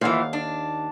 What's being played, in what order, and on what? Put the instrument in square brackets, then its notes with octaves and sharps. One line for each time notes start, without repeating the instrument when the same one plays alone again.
[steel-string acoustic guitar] D#2 F5 [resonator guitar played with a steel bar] A#2 E3
[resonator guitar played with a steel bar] D4